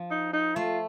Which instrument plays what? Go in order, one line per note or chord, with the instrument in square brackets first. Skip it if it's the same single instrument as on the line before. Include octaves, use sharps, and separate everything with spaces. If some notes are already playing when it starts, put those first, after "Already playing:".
Already playing: [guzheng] F3
[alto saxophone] D#4
D#4
[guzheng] A3 [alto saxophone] F4